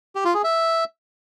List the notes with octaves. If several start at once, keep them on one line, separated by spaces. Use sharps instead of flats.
G4
F4
G#4
E5